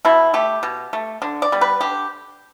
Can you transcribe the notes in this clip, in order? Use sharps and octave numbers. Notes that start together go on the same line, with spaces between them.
B2 E4
A3 G4
B2
A3
D3
D5
G3 B3
B4
D3 G4